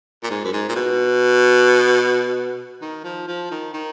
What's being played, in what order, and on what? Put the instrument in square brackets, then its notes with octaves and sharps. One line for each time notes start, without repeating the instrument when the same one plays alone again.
[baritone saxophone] A#2
G#2
F#2
G#2
A#2
B2
D#3
F3
F3
D#3
D#3